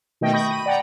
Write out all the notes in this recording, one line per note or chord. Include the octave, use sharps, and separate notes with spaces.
B2 D#3 A3 D#5 G5
B5 C#6 D#6 G6 A#6
B5 D#7
D5 F#5 G5 A#5